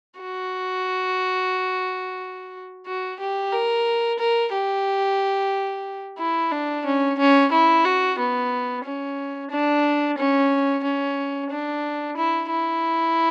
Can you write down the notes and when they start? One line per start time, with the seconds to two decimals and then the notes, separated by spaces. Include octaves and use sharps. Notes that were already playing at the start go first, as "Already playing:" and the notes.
0.20 F#4
2.87 F#4
3.20 G4
3.53 A#4
4.19 A#4
4.53 G4
6.19 E4
6.52 D4
6.85 C#4
7.19 C#4
7.52 E4
7.85 F#4
8.19 B3
8.85 C#4
9.51 D4
10.18 C#4
10.84 C#4
11.50 D4
12.17 E4
12.50 E4